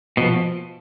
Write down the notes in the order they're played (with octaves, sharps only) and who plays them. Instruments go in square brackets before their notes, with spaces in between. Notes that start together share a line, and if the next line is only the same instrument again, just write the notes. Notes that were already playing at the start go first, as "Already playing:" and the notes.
[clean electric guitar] B2 [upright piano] F3